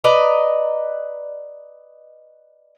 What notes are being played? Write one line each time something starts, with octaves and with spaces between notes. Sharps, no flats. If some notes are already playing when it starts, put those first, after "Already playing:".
B4 D5 D#5 A#5